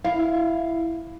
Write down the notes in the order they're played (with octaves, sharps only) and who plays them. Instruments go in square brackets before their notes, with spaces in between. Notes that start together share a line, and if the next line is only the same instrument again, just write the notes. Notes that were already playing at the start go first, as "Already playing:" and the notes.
[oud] E4 [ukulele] F5